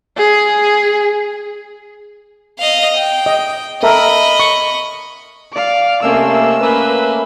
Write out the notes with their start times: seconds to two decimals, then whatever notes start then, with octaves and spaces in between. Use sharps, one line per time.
0.17 G#4
2.59 D#5 F5
2.97 G5
3.26 D#5
3.83 A4 A#4 D#5 E5 B5
4.40 C#6
5.53 D5 F5
6.03 C3 A3 A#3 C#4 D#5 E6
6.61 A#3 C#4 B4